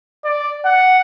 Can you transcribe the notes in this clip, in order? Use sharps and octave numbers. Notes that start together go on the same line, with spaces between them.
D5
F#5